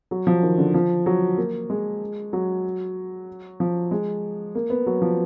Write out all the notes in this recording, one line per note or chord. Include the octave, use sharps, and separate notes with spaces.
F#3
F3
D#3
D3
F3
F#3
A#3
G#3
F#3
F3
G#3
A#3
B3
F#3
F3